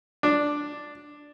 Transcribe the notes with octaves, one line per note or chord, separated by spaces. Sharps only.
D4